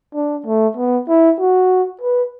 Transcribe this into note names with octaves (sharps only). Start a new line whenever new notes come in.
D4
A3
B3
E4
F#4
B4